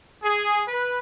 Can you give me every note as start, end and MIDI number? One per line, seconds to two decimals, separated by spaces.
0.23 0.61 68
0.68 0.99 71